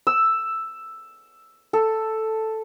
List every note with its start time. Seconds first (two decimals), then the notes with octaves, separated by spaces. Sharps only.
0.07 E6
1.73 A4